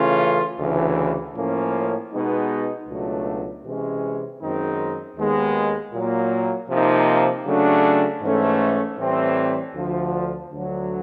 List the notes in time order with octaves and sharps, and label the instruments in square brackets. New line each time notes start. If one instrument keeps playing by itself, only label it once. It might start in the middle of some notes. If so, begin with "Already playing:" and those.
Already playing: [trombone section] C#3 E3 A3 C#4 F4
D2 C#3 E3
A2 F3 A#3 C#4
B2 G#3 B3 D#4
C#2 B2 F#3 A3 D4
C3 E3 G#3 C#4
F#2 D#3 G#3 C4 D#4
D#2 D#3 G#3 B3
A#2 F#3 A#3
C3 F3 A#3 D#4
C#3 F#3 A3 D4
G#2 E3 A3 C#4
A2 E3 G3 C4
D2 D3 F3
D2 D3 F#3